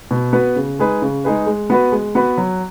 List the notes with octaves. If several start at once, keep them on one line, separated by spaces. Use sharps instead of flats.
B2
B3 F#4 B4
C#3
G#3 D#4 G#4 B4
C#3
G#3 D#4 G#4 B4
G#3
B3 F#4 B4
G#3
B3 F#4 B4
F#3